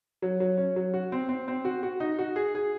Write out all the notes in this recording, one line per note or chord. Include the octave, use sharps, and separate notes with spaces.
F#3
F#3
C#4
F#3
F#4
C4
C4
C4
F#4
F#4
D#4
F#4
G#4
G#4